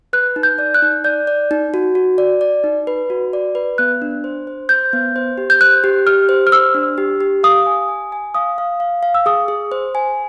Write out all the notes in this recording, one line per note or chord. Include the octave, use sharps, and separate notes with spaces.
B4 F#6
D#4
G6
D5
F#6
D#4
D5 G6
D5
D#4
F#4
F#4
D5
D5
D#4
B4
F#4
D5
B4
B3 F#6
D4
C5
C5
C5 G6
B3
C5
G4
G6
C5 F#6
G4
G4 F6
C5
F6
C5 E6
D4
G4
G4
F5 D#6
G#5
G#5
G#5
F5 D#6
F5
F5
F5
E6
G#4 D#6
G#4
C5
G#5